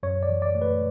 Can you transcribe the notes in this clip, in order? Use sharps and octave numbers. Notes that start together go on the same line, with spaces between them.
F#2 C#5
D5
E3
D5
A3
B4